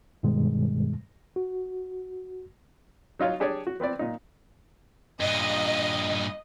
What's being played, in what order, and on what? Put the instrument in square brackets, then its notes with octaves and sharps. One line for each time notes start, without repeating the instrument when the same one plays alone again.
[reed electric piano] G2 B2 D#3 G3 G#3
F#4
[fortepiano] F#3 D#4 F4 C#5 F5
D4 G4 G#4 C#5 D5
F#4
B3 C4 B4 D5
A#2 D#4
[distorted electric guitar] G2 A#2 [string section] D#5